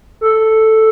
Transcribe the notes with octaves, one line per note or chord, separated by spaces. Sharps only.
A4